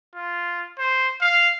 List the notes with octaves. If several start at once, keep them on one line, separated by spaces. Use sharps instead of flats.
F4
C5
F5